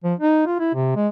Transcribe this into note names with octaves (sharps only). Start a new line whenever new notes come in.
F3
D#4
F4
E4
C3
G#3